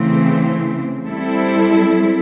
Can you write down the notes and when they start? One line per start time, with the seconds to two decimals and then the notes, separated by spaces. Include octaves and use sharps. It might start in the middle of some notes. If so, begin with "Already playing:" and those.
Already playing: C#3 E3 A3 C4
1.05 G3 C4 E4 A4